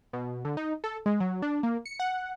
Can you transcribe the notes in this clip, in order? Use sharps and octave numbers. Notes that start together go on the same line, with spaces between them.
B2
D3
D#4
A4
G#3
F#3
D4
A#3
C#7
F#5